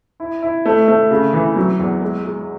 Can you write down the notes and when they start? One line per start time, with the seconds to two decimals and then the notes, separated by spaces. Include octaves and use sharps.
0.20 E4
0.42 E4
0.66 A3
0.88 A3
1.11 C#3
1.33 E3
1.56 F#3
1.79 E2
2.01 G#3
2.25 G#3